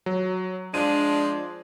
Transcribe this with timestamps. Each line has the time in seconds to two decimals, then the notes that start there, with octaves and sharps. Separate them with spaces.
0.06 F#3
0.74 F3 G#3 D4 D#7